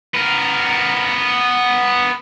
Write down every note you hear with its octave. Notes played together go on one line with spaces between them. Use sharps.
B3 A#4